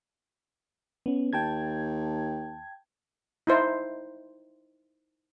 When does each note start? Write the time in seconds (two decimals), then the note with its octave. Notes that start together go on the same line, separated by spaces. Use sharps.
1.06 B3 C#4
1.33 D#2 G5 A5 G#6
3.47 D#4 E4 C5